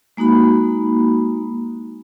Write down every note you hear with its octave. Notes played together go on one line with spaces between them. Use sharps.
G#3 A#3 D#4 F#4 B5